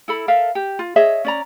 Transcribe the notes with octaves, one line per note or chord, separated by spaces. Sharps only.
E4 A4 B5
A4 A#4 E5 F5
G4
F4
G#4 C#5 D#5 E5
C#4 D5 A#5